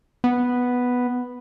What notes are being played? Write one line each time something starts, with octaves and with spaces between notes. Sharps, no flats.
B3